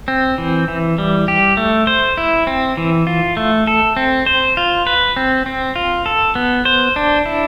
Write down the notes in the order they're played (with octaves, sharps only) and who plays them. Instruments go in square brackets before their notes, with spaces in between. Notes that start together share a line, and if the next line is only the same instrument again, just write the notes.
[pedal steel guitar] C4
E3
E3
G3
G4
A3
C5
E4
C4
E3
F4
A3
A4
C4
C5
F4
B4
C4
C4
F4
A4
B3
C5
D4
E4